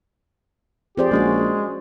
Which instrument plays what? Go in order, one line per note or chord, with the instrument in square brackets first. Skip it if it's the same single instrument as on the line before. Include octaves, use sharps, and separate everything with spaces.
[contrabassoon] F2 [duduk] G4 [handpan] G#4 C5 D5
[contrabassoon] A#1 [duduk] G#3 [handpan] C#4 F#4 G#4